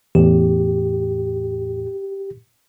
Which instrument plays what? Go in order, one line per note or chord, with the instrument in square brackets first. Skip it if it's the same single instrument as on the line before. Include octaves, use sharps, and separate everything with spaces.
[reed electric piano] E2 A2 [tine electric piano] G4